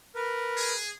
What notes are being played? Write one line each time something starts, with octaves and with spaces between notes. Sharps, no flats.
A#4 B4
G#4